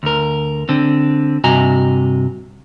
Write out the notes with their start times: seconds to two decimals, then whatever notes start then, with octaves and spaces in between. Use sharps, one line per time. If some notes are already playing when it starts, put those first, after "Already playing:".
0.03 D2 A#4
0.69 D3 C4
1.44 G2 C3 F#4 D#5 G#5 A#5